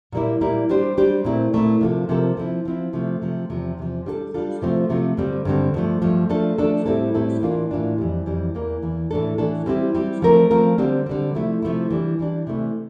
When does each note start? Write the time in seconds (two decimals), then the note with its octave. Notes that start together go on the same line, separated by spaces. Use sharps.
0.12 A#2 G3 A#3 E4
0.41 A#2 G3 A#3 E4
0.69 G3 D4 G4 C5
0.97 G3 D4 G4 C5
1.25 A#2 A3 C4 E4
1.53 A#2 A3 C4 E4
1.81 C3 F3 A#3 F4 A4
2.09 C3 F3 A#3 F4 A4
2.37 F3 C4 E4
2.65 F3 C4 E4
2.93 C3 F3 A3
3.22 C3 F3 A3
3.50 E2 C3 F3
3.77 E2 C3 F3
4.06 G3 D4 F4 A4
4.34 G3 D4 F4 A4
4.62 C3 F3 A3 C4 F4
4.90 C3 F3 A3 C4 F4
5.17 G2 D3 G3 C4
5.45 G2 D3 G3 C4
5.74 G2 F3 A3
6.02 G2 F3 A3
6.29 F3 A3 D4 A4
6.58 F3 A3 D4 A4
6.86 A2 G3 C4 E4 A4
7.15 A2 G3 C4 E4 A4
7.42 A2 E3 A#3 D4 F4
7.71 A2 E3 A#3 D4 F4
7.98 F2 E3 G3
8.26 F2 E3 G3
8.55 E2 E3 A#3
8.82 E2 E3 A#3
9.11 A2 E3 A3 D4 A4
9.38 A2 E3 A3 D4 A4
9.66 G3 C4 E4 G4
9.95 G3 C4 E4 G4
10.22 F3 A3 C4 F4 A#4
10.51 F3 A3 C4 F4 A#4
10.78 D3 G3 C4
11.06 D3 G3 C4
11.35 C3 F3 A3 E4
11.62 C3 F3 A3 E4
11.90 E3 G3 D4
12.19 E3 G3 D4
12.47 C3 E3 A3 E4